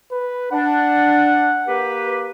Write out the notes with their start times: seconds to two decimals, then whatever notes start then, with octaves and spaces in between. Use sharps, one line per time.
0.12 B4
0.52 D4 F#5
1.67 A#3 G4 B4